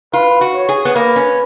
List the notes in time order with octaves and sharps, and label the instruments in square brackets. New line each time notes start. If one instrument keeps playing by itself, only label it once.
[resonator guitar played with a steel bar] F4 [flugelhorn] B4
[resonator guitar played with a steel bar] F#4
[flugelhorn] C#5
[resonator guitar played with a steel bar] G#4
B3
[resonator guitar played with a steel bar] A#3 [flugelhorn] B4
[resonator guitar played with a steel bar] C#4